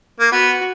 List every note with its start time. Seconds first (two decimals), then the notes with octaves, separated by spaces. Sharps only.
0.20 A#3
0.32 B3 F#4